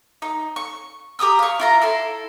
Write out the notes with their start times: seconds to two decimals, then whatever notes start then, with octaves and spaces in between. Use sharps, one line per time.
0.22 D#4
0.56 C#6
1.19 G4 A#5 D#6 E6
1.39 F5 C#6
1.59 E4 F4 A#5
1.82 E4 A4 C6